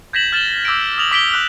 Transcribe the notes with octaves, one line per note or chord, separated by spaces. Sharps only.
G6 G#6 A#6 B6 E7 F#7
F6 A6 E7 F#7 G7
D6 E6 G6 A#6 D7
D#6 F6 A6 F7 F#7
D6 B6 D7 G7
D6 F#6 B6